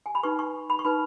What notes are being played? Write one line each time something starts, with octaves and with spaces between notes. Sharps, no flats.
G#5
B5
D#4 B4 C#6
C#6
B5
C#6
D#4 B4 B5